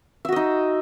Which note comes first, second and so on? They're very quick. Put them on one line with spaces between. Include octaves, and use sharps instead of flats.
E5 F#4 D#5 D#4